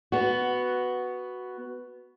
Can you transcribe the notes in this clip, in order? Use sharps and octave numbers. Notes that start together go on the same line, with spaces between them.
B3 F#4